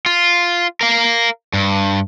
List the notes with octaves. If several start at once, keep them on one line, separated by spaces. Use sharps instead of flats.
F4
A#4 F5
G2